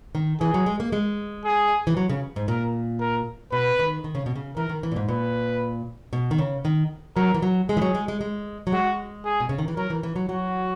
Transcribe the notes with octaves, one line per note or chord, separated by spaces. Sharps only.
D#3
E3 G#4
F#3
G#3
A#3
G#3
G#4
E3
F#3
C#3
G#2
A#2 A#4
A#4
B2 B4
D#3
D#3
C#3
B2
C#3
E3 A#4
D#3
E3
A#2
G#2
A#2 B4
B2
D#3
C#3
D#3
F#3 A#4
E3
F#3
G#3 G#4
E3
F#3
G#3
G#3
G#3
F#3
G#3 F#4
G#4
B2
C#3
D#3
E3
F#3 A#4
E3
E3
F#3
F#3 F#4